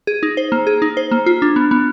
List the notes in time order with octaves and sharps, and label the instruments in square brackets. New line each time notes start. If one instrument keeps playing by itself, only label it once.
[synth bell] G#4
D#4
C5
A#3
G#4
D#4
C5
A#3
F4
D4
B3
B3